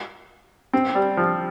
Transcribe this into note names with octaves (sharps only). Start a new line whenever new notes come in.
C4
G3
F3